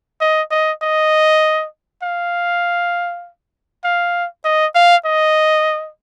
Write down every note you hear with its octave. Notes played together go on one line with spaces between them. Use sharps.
D#5
D#5
D#5
F5
F5
D#5
F5
D#5